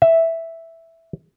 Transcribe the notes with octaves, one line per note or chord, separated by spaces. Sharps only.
E5